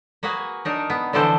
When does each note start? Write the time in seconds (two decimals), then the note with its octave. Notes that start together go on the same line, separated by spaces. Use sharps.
0.23 A#3 F#4 G#4 B4 G#5
0.65 D4 D#4 A#4
0.90 B3
1.13 D3 E3 F3 D4 A4 C5